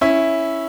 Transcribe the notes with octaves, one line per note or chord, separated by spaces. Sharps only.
C#4 E4